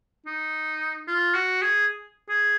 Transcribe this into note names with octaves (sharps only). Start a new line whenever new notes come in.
D#4
F4
F#4
G#4
G#4